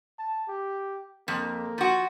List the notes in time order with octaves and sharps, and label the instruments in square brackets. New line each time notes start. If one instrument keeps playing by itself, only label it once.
[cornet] A5
G4
[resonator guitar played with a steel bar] F2 [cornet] A#3
[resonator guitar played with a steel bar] F3 F#4